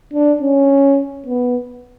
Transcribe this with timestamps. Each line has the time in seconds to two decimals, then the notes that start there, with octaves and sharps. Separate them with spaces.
0.13 D4
0.41 C#4
1.26 B3